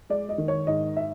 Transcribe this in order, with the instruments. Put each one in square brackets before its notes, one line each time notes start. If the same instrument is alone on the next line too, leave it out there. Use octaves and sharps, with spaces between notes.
[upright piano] G#3 D5
D#5
D#3
C#5
G#2 D#5
E5